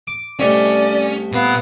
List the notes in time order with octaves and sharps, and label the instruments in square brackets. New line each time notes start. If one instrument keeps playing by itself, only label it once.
[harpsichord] D6
[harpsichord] C2 A3 D#5 [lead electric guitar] C#4 [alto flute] D5
[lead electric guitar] A#2 F5 [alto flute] B3